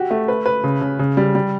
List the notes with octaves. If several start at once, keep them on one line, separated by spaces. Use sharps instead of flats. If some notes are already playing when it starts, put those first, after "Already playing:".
Already playing: F#4 G4
A3
B4
B4
C#3
C#3
C#3
G3
G3